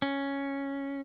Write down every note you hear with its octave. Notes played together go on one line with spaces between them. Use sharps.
C#4